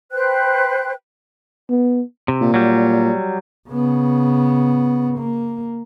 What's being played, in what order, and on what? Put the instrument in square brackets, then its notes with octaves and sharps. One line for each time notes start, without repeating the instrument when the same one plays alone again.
[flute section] B4 C5 G5 F#6
[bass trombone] B3
[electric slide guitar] C3
[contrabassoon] A#2
[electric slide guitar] F#3 G3
[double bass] C#3 B3
A#3